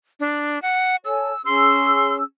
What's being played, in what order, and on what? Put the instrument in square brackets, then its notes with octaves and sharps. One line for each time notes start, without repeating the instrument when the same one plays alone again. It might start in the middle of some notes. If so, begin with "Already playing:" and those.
[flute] D4
F#5
[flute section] A4 C#5 G#5 [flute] E6
[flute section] C#4 G#4 E6 [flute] C6